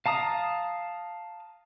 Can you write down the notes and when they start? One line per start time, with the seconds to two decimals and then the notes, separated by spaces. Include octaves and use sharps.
0.06 F5 A5 A#5 D#6